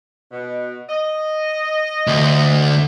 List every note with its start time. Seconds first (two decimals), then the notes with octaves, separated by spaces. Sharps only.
0.32 B2
0.89 D#5
2.07 D2